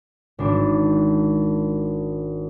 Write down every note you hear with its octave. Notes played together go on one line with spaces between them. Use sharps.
G#1 D4